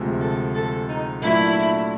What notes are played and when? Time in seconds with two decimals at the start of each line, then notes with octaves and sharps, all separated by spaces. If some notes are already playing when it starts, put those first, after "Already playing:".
Already playing: D2 C3 F3 G#3
0.21 A4
0.55 A4
0.88 D#4
1.22 A#2 F#3 A3 D4 E4